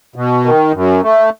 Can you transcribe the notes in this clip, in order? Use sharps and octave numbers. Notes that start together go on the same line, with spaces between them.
B2
D#3
F#2
A3